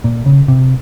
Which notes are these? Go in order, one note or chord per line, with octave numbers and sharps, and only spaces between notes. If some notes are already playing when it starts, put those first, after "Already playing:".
A#2
C#3
C3